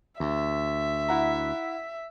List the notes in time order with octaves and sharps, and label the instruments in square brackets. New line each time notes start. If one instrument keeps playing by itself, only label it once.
[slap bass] D2 [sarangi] E5
[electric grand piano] E4 F#5 A#5